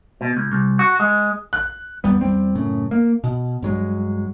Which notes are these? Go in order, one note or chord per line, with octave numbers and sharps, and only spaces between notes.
B2
C#2
C2
F#4
G#3
F#6
E2 G3 B3
E2 G3 C4
F#2 A2 C#3
A#3
B2
G2 F#3 G#3